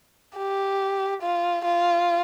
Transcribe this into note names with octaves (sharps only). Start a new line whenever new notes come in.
G4
F4
F4